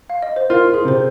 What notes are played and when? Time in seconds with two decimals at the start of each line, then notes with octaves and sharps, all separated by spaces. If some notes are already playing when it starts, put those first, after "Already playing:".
0.10 F5
0.22 D#5
0.36 C5
0.50 F4 A#4
0.67 F4
0.74 G#4
0.85 C3 C5